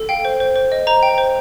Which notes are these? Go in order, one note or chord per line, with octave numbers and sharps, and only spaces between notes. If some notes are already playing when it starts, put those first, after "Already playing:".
Already playing: A4
F5 G5
C5
C5
C5
D#5
C5 A#5
G5
C5